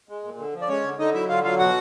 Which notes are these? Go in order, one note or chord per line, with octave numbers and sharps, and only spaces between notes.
G#3
A#2
D3
F3
D5
G#3 C#4 C#5
D3
D3 D#4 D#5
F#3 E4 E5
D3 F4 F5
F#3 F4 F5
B2 F#4 F#5